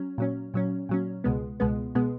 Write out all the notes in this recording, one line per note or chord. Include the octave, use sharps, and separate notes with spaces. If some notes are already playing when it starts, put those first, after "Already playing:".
Already playing: F#3 C#4
A#2 F#3 C#4
A#2 F#3 C#4
A#2 F#3 C#4
C#2 B2 G#3 B3
C#2 B2 G#3 B3
B2 G#3 B3